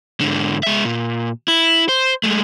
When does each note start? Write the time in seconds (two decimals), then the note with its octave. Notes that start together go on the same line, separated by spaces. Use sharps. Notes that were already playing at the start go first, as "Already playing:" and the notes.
0.21 G#2 D3
0.63 G#3 E5
0.85 A#2
1.48 E4
1.89 C5
2.24 G#3 A3